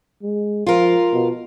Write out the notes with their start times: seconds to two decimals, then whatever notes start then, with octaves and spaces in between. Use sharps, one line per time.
0.23 G#3
0.66 F3 F4 A#4
1.13 B2